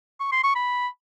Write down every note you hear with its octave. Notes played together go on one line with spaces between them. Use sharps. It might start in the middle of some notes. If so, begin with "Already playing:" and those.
C#6
C6
C#6
B5